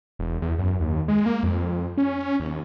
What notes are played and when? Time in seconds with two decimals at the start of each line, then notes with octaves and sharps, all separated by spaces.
0.19 E1
0.42 E2
0.58 F#2
0.80 D#2
1.08 G#3
1.26 A#3
1.43 F2
1.97 C#4
2.40 D#2